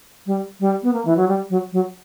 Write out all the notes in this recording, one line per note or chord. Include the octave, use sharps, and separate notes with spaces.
G3
G3
B3
A#3
E3
F#3
G3
F#3
F#3